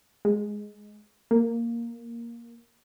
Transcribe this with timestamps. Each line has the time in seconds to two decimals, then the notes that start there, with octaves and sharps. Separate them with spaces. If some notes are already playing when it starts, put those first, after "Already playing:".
0.25 G#3
1.31 A#3